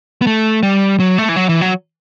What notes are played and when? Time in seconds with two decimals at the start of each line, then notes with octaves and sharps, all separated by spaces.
0.22 B3
0.27 A3
0.63 G3
1.00 F#3
1.18 A3
1.29 E3
1.36 F#3
1.49 E3
1.61 F#3